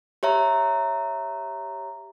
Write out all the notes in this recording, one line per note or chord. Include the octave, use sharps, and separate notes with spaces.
G4 C#5 E5 A#5